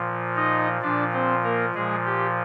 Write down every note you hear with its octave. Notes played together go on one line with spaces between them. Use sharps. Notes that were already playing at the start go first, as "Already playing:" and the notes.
Already playing: A#2 F3
D#4 D#5
A#2 F3 D4 D5
C4 C5
A#3 A#4
A#2 F3 G#3 G#4
G4